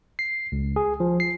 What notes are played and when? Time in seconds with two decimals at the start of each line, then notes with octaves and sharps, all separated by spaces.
0.19 C7
0.52 C#2
0.76 G#4
1.00 F3
1.20 C7